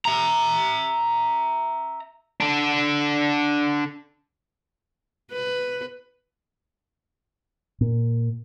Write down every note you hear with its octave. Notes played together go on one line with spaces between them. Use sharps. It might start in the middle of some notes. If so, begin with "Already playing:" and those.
E5 A#5
D4 A4
B4
A#2